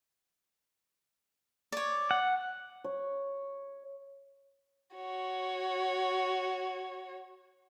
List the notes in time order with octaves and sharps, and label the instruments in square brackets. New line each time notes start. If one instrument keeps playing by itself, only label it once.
[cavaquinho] C#5 D5
[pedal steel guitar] F#5
[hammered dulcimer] C#5
[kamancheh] F#4 C#5